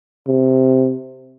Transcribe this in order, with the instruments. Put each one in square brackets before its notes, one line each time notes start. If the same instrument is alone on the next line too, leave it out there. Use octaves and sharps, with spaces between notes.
[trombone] C3